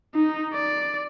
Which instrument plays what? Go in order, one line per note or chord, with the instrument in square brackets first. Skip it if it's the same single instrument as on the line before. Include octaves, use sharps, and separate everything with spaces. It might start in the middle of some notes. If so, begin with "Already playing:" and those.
[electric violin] D#4
D5